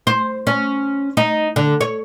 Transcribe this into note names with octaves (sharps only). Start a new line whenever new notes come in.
C5
C#4
D#4
D3
C#5